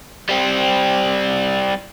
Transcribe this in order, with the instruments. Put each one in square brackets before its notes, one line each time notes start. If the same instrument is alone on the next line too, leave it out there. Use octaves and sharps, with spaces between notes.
[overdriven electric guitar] G3 C4